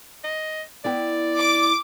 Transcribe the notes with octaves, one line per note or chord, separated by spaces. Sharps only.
D#5
B3 E4 D5 G5
D6